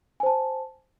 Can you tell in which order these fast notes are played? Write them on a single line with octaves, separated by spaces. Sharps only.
G#5 C5 A5